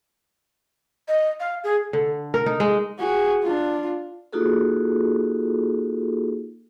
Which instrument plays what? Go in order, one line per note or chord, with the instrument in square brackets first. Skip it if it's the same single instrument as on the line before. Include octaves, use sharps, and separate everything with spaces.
[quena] D#5
F5
G#4
[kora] D3
A#4
D#4
G#3
[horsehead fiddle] F#4 G#4
D4 F4
[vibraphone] A#3 D#4 F4 F#4 G#4 A4